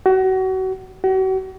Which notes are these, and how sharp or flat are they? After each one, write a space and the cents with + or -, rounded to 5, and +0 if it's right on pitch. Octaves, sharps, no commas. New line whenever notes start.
F#4 +30
F#4 +40